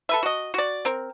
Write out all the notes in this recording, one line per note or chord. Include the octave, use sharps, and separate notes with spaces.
A4 B4 E5
F#4 D#5
F#4 D5
C4 A#4